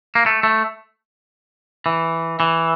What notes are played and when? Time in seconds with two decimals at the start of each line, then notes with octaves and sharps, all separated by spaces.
0.15 A#3
0.26 A3
0.43 A3
1.86 E3
2.40 E3